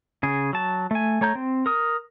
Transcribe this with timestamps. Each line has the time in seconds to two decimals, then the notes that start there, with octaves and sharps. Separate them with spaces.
0.23 C#3 G#4
0.53 F#3 A5
0.91 A3 G#5
1.21 A3 C#5 A#5 G6
1.35 C4
1.66 A#4 D#6